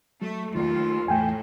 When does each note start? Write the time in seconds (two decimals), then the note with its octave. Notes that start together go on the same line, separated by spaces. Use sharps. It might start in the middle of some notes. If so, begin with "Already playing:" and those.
0.22 F#3 A3
0.55 D#2 D#3 A3 F4
1.08 E2 A2 E3 A3 G5 G#5